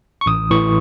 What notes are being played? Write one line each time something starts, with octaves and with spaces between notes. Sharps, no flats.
C#6
A1 D#6
A2 E3 C#6